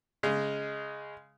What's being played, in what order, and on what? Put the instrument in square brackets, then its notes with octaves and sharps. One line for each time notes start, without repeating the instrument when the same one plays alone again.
[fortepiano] C#3 G#3